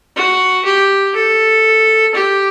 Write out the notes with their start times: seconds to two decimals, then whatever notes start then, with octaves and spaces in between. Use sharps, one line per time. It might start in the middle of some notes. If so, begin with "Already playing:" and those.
0.16 F#4
0.65 G4
1.15 A4
2.15 G4